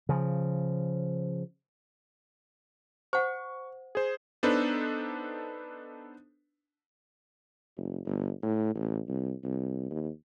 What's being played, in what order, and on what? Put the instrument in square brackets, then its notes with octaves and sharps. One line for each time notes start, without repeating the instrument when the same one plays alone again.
[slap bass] C#3 F3
[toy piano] C5 F#5 [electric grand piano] C#6
[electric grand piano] G#4 C5
B3 D4 D#4 A4 B4 C5
[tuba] F#1
G1
A2
A1
C2
C2
D#2